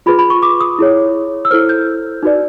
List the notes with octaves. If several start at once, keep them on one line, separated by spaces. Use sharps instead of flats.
F4 G#4 B4 B5
B5
C#6
D6
D#6
E4 G#4 C#5
E6
E4 A4 C5 F6
G6
D#4 F#4 B4 D5